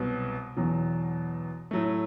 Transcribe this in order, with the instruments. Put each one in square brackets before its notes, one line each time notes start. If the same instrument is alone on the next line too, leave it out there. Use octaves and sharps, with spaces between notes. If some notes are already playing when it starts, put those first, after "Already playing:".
Already playing: [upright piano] C2 B2 F#3 B3
E2 B2 F#3
A2 F#3 A3